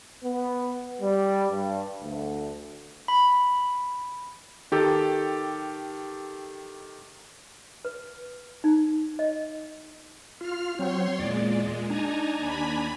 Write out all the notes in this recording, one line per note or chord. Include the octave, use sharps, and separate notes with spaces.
B3
G3
G2
D2
B5
D#3 G4 A4
B4
D#4
D#5
F4 F6
F#3 C4 C#5 C6
E2 A#2 G#3 D5
D4 D#4 G#5 A#5
D#2 B5